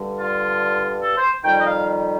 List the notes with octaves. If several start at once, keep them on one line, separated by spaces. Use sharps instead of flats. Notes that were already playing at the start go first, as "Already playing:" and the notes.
Already playing: G2 D3 G3
F4
A4
C5
F2 D#3 G3 G5
D#5
F5